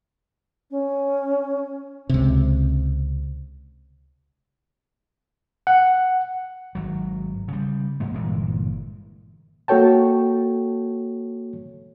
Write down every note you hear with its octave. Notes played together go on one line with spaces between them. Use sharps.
C#4
C#2 C3
F#5
G#1 F#3
C#3 G3
G#2 G#3 A#3
G1 A#2 E3 G#3
A#3 F#4 A4 C#5 G5 A5